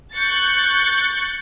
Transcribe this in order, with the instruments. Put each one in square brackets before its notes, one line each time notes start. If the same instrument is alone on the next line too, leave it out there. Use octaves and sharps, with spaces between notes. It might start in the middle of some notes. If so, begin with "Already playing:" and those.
[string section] C#6 F#6 G6 A6 C#7